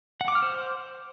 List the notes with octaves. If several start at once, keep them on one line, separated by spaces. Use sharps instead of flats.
F#5
D6
F6
C5